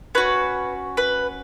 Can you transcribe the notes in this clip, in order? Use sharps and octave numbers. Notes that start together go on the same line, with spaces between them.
C#4 F#4 B4
B4